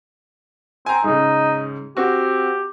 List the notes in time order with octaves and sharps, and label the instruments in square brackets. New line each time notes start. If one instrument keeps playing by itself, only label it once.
[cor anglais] C4 [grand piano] G#5 A#5
[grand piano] G#2 C#3 [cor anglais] D#4
[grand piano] C4 F#4 [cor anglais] G4